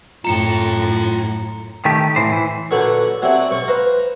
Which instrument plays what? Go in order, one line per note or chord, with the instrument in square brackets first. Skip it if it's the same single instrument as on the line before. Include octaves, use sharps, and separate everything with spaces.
[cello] F#2 A2 [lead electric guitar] F4 G5 [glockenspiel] A#5 C#7 E7
[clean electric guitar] D#3 A3 G4
A2 E3 C5
E3
[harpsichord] A#1 D3 F#3 A4 B4 C#6
F#3 C4 D4 E4 F#4 G4
B1 C#6
B4 C5 F5 A#5